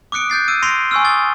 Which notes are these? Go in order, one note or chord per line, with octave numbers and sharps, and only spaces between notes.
D6 D#6 F#6 C#7 D7
F#6 G6 A6 C7
E6 D#7
C6 A#6 C7 D7 F7 G7
G#5 C#6 E6 F6
D#6 A6 G7